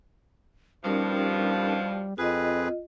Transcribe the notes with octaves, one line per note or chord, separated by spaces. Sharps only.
G2 B2 F3 G3 C#4 D#4 A#4
F2 C4 F4 G#4 B4 D#5